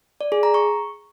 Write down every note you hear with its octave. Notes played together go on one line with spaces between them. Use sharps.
D5
G#4
A#5
C#6